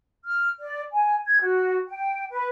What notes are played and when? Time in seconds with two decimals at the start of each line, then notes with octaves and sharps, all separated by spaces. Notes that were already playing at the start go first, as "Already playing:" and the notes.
0.24 F6
0.60 D5
0.92 G#5
1.26 G#6
1.41 F#4
1.88 G5
2.31 B4